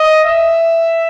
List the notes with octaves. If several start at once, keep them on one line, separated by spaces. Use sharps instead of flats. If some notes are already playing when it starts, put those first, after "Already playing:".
Already playing: D#5
E5